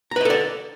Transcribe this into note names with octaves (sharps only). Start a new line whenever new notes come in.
A4 B4 D5 D#5 A#5